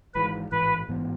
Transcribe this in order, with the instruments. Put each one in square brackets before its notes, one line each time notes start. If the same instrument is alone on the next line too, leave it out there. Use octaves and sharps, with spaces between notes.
[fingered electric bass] G#1 G#2 E3 G#3 [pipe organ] B4
[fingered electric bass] A1 G#2 E3 [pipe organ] B4
[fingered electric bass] A1 G#2 E3 B3